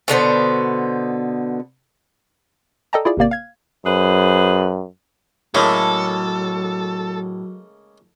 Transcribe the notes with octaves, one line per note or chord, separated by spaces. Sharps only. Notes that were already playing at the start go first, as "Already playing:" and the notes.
B2 D3 B3 C5
A4 D5 D#5 G5 A5 A#5
E4 F4 G#4 D5
G#1 C3 A#3 D5
F5 G#6
F#2 G#4 B4 C5
A2 C#3 F#3 G#3 A#3 A4